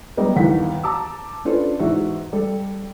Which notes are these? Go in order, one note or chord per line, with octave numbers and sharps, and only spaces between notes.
F#3 G3 B3 A#4 D#5
G1 D#2 E3 F#5 B6
A5 A#5 D6 E6
C#4 D4 F4 A4 B4 C5
E2 G#2 F#4 E5
G3 A4